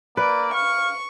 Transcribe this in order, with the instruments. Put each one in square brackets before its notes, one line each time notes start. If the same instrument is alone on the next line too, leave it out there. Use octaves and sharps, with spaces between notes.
[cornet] A#3 [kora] B4 [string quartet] D5
[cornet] F5 [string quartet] C#6